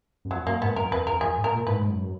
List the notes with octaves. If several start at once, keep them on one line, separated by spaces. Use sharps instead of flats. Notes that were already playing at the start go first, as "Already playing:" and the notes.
F#2
F2 F#3
F#2 A#3
G#2 B3
F#2 A#4
F2 B4
F2 A#4
F2 G#4
G#2
A#4
A#2
G#2 B4
G#2
F#2